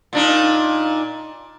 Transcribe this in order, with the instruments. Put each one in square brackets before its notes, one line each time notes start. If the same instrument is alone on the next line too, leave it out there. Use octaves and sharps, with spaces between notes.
[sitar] A#2 D4 D#4